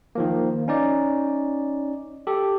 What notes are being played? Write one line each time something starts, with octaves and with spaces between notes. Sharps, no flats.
D#3 F3 A#3
C#4 D#4 D5
G4 A4